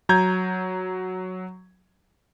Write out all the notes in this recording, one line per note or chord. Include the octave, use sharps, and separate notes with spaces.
F#3 A#5 G6 G#6